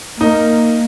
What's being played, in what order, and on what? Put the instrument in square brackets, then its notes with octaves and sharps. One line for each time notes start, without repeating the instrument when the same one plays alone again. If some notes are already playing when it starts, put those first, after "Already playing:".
[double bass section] A#3 [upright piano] D#4